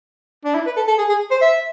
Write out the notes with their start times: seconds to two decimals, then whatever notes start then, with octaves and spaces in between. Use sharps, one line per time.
0.45 D4
0.55 E4
0.66 B4
0.77 A4
0.88 A4
0.98 G#4
1.09 G#4
1.31 C5
1.42 E5